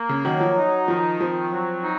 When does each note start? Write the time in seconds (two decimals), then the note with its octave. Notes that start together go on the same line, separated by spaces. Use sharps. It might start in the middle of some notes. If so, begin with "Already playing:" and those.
Already playing: A#3
0.09 C#3
0.24 D#3 F#3
0.40 F3
0.57 D#4
0.88 D#3 F3
1.20 F3 C4
1.52 F#3
1.83 D#4